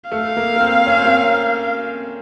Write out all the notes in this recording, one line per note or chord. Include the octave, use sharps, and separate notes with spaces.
A3 F5
A#3
A#3
C4
C#4
C4
A#3